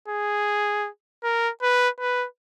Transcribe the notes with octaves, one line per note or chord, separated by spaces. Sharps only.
G#4
A#4
B4
B4